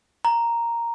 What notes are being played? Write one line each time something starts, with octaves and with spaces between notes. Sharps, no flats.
A#5